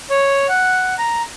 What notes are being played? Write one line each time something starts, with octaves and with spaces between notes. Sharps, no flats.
C#5
F#5
A#5